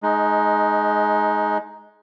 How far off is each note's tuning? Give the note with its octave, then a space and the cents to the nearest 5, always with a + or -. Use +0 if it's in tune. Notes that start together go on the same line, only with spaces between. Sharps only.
G#3 +20 D#4 +0